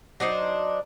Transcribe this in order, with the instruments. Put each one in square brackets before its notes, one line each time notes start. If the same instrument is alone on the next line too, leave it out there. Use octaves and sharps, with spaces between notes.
[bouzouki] F#3 D4 D#4 C5